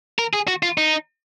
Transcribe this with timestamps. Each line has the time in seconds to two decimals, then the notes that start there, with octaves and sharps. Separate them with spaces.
0.19 A#4
0.33 G#4
0.48 F#4
0.63 F4
0.78 D#4